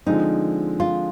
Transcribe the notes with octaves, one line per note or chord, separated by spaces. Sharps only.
D3 F3 G#3 C4 D#4
F4